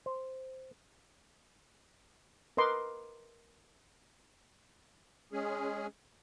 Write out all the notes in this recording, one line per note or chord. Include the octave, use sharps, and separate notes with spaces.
C5
A#4 B4 D#5 C6 D6
G#3 C#4 G#4